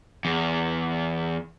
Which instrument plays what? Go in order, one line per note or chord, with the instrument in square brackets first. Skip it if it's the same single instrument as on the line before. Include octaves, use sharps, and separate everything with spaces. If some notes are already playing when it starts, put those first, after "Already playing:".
[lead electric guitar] E2